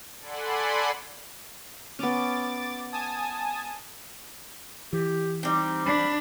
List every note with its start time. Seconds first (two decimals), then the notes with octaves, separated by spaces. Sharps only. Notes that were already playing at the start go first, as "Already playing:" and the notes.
0.20 A4 D5 F#5 G#5 B5 C6
1.99 B3 C#4 D6 A6
2.92 G#5 A5 D#6
4.93 E3 G4
5.43 G3 C4 D#4
5.86 D4 B5